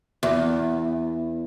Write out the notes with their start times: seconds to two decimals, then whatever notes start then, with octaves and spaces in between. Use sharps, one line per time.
0.23 E2